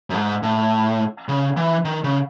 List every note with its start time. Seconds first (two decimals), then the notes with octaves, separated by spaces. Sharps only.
0.10 F#2
0.14 G#2
0.43 A2
1.29 C#3
1.57 E3
1.85 D#3
2.04 C#3